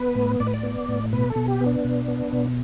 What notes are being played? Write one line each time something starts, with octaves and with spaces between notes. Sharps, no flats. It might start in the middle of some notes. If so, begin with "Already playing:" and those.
Already playing: B3 B4
A2
A2 D5
B4
D5
B3
A2
B2 B4
A4
B2
G4
B3
D4
B2
B3
B2